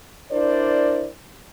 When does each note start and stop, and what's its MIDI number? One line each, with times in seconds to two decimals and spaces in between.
0.31 1.07 62
0.31 1.07 64
0.31 1.07 70
0.31 1.07 72
0.31 1.07 74